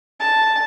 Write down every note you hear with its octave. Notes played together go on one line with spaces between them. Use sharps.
A5